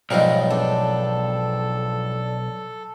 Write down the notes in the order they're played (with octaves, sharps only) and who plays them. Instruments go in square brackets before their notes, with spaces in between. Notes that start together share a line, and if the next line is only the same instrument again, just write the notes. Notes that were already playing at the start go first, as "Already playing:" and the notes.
[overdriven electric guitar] B1 [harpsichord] G#2 F3 G3 [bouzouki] D#4 F4 A#4
[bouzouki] D4 [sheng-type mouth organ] A4